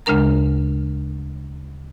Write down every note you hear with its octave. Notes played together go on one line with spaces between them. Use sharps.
D2 C#3 G#3 D4 A#4 A#5